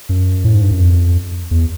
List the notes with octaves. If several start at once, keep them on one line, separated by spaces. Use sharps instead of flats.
F#2
A2
G#2
G2
F#2
F2
E2